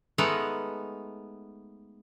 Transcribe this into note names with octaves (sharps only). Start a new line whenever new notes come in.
G#3 A3 B3 D#4 A#4 F#5